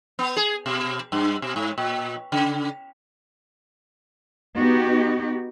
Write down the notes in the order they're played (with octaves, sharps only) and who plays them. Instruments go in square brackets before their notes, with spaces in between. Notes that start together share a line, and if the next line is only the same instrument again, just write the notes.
[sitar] B3
G#4
B2
G2
B2
G#2
A#2
C#3
[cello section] B3 D#4 F#4 G4